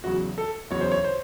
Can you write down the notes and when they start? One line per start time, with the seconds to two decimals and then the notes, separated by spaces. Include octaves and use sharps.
0.04 E2 C#3 F#3 F#4
0.38 A4
0.70 E2 C#3 F#3 C#5
0.81 C5
0.92 C#5
1.04 C5